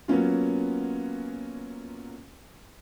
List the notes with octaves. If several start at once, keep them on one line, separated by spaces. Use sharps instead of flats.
F#3 A#3 B3 C#4 F4